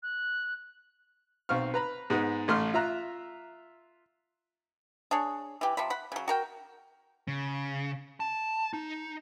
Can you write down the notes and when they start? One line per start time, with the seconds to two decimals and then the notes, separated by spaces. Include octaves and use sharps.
0.03 F#6
1.49 B1 C4 F5 C#6 F6
1.74 B4 A#5 B5
2.10 G#2 G#3 B3
2.48 A1 A3 C6 F6
2.74 F4 E5 A#5 F#6
5.11 D4 G#4 C#5
5.61 E3 G4
5.77 C3 F3 B5
5.90 F#5 B5
6.12 C#3 F#3
6.28 F#4 A#4 G5
7.28 C#3
8.20 A5
8.73 D#4